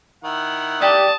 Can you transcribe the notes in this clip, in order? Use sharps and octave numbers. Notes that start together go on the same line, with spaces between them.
D#3 E4 F#5
G4 D5 A5 D#6